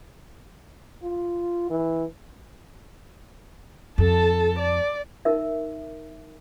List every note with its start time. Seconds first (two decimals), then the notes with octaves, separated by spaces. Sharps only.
1.03 F4
1.70 E3
3.98 F2 A4 A5
4.58 D5
5.25 D#4 A#4 E5